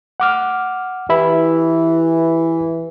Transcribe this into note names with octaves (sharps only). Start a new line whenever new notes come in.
F#5 D6 F6
E3 G4 E5 B5